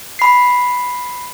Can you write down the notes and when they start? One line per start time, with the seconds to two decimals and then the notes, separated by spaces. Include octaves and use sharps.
0.19 B5 C7